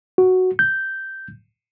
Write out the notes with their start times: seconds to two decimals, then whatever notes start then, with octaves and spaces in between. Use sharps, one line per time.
0.18 F#4
0.59 G6